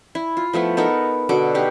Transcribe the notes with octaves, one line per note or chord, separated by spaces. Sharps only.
E4
F4
F3 A3 B3 E4
B3 D#4 A4 A#4
B2 D3 A4 D6
D#4 G4